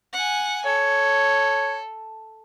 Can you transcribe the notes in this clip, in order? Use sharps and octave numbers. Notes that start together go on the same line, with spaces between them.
F#5 G#5
A4 C#5